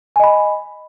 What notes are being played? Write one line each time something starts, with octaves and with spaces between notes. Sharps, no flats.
D#5 G#5 B5